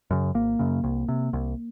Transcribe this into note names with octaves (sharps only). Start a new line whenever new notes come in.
F#2 C#3
G#1 A#3
F#2 C#3
C2
C3
C2